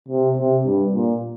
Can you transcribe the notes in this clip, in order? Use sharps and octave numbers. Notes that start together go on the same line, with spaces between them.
C3
C3
G2
A#2